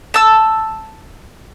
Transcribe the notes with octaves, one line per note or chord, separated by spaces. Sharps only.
A5 E6